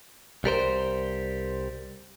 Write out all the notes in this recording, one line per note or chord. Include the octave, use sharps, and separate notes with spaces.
C2 G3 A#4 C5